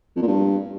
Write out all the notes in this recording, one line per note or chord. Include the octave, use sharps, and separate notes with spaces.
F2
A#2
G2